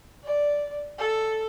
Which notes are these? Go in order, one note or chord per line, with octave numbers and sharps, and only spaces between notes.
D5
A4